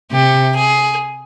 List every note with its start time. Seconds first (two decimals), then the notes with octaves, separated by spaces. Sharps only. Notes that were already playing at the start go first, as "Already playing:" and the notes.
0.11 C3 G4
0.55 G#4